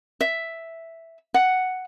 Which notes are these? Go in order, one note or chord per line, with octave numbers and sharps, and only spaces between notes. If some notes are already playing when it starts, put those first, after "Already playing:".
E5
F#5